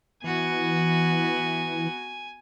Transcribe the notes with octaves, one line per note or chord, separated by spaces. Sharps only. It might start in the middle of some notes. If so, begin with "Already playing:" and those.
E3 B3 F#4 G#5